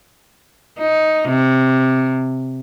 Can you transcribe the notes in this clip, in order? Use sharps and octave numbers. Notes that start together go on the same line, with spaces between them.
D#4
C3